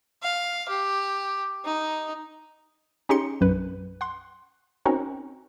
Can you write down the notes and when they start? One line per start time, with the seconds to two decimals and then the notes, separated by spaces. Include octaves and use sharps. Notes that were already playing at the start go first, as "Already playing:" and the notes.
0.23 F5
0.69 G4
1.65 D#4
3.09 C#4 D#4 G4 G#4 C6 C#7
3.41 B1 F#2 B4
4.01 F#5 C6
4.85 C4 C#4 D#4 F#4 A#4